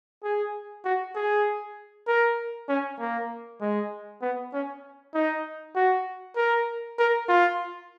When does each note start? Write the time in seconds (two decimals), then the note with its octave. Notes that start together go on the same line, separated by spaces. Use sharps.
0.24 G#4
0.85 F#4
1.15 G#4
2.07 A#4
2.69 C#4
3.00 A#3
3.61 G#3
4.22 B3
4.53 C#4
5.14 D#4
5.75 F#4
6.37 A#4
6.98 A#4
7.29 F4